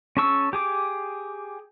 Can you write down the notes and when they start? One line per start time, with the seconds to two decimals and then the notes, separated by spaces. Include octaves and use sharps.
0.17 C#4 G#4 A5 C#6 E6
0.53 G4 G#4 D6